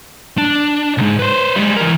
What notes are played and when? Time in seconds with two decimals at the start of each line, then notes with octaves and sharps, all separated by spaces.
0.38 D4
0.98 C2 G#2
1.19 B4 C5
1.56 G3 G#3
1.76 E3 A#4